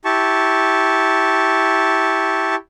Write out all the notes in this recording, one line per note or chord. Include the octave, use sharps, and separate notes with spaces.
E4 G4 A5 C#6